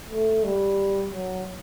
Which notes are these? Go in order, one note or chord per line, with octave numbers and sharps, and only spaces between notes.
A3
G3
F#3